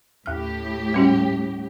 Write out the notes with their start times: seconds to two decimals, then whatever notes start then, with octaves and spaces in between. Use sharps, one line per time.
0.26 D#2 A2 G4 F6
0.94 G3 C#4 F#4